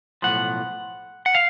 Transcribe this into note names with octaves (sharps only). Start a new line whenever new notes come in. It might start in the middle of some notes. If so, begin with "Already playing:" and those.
B1 A2 F3 F#5
F#5
F5